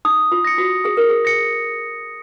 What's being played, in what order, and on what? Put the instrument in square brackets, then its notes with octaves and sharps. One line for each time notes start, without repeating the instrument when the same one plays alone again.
[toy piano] D#4 [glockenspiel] D#6
[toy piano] F4
[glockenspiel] A#6 C#7
[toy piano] F#4
[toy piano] G#4 [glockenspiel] D#6
[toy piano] A#4
G#4
[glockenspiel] A#6 C#7